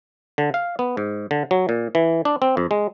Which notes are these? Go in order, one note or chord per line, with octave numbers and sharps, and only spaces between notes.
D3
F5
B3
G#2
D3
F#3
A#2
E3
D4
C4
F2
G#3